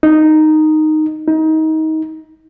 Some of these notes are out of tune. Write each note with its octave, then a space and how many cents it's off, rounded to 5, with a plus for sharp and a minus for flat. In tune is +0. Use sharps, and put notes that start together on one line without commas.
D#4 -5
D#4 +25